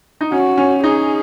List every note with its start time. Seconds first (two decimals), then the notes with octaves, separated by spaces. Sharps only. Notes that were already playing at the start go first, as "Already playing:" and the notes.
0.21 D#4
0.32 C#4 F#4
0.58 C#4
0.84 D#4 G#4